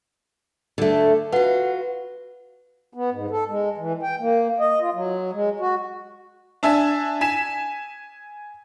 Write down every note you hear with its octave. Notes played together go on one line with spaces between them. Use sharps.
D3 A3
F4 F#4 B4 F#5
B3
G#2
A4
G#3
E3
G5
A#3
D#5
F4
F#3
G#3
F#4
D4 E5 G#5 A5
G#5 B6 E7